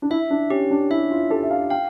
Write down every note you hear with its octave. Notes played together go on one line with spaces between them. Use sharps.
D4
E4 E5
D4
C#4 G4
D4
E4 E5
F4
G4 A4
E5
F5
F5 G5